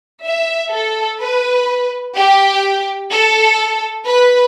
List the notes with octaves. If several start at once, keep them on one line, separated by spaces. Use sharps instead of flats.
E5
A4
B4
G4
A4
B4